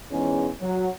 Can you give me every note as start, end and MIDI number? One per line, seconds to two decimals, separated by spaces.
0.11 0.48 40
0.11 0.48 44
0.11 0.48 61
0.60 0.87 54